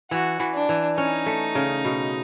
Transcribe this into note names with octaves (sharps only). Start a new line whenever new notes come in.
E3 F#4
E3
D4
E3
C#4 D#4
A3
C#3
B2